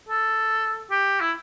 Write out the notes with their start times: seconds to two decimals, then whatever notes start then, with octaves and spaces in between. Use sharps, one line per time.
0.09 A4
0.91 G4
1.20 E4